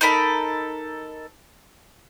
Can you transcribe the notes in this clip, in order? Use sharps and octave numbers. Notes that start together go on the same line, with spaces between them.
D#4 A4 A#4 B5